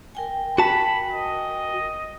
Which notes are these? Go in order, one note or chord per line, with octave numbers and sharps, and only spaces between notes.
A#4 G5 G#5
F#4 A5 B5
D#5